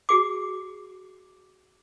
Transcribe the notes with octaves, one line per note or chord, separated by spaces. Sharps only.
F#4 G#4 D6